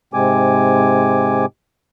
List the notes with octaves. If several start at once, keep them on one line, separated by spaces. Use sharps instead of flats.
G#2 C3 G#3 C4 G#5 D6